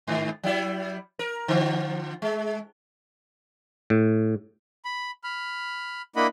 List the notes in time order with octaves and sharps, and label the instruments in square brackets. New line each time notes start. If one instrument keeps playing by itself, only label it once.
[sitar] G#2 D#3
F#3 G3 E4
A#4
D3 F3
G#3
[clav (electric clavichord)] A2
[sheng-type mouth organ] B5
B5 F6
A#3 D4 E4 D#5 F#5 B5